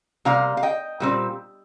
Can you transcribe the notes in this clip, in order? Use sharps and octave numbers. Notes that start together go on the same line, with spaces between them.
C3 G3 A#3 F5 A#5
F5
D#5 G5
A#2 G3 C4